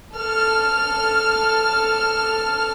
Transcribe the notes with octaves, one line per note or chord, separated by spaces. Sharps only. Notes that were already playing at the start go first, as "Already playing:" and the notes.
A4 F6